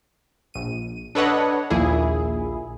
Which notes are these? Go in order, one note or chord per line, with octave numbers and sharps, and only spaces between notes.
A#1 D#7
D4 A4 B4 C#5 D#5 F#5
A#1 D#2 A#2 E4 G#4